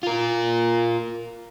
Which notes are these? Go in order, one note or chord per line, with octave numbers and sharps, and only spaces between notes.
F4 A#4